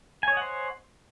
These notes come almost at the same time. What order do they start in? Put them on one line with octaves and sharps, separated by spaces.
G#5 C#5 D#5 F#5 C5